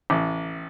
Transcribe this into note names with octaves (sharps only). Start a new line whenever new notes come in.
A1